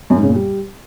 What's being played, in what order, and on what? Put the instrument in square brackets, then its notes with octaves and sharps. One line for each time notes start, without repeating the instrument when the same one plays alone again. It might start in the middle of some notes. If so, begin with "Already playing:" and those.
[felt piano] F#2
G#2
C#3
A#2
G3